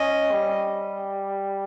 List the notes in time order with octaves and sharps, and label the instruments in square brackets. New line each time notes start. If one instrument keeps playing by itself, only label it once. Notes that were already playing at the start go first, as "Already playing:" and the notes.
Already playing: [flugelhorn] C#4 [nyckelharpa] D#5
[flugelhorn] G3